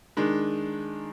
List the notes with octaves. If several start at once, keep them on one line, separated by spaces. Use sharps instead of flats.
D#3 G#3 D4